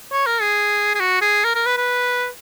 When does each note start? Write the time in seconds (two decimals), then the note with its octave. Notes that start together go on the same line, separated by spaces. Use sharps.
0.12 C#5
0.26 A#4
0.41 G#4
0.95 G#4
1.00 F#4
1.22 G#4
1.44 A#4
1.55 A#4
1.66 B4
1.77 B4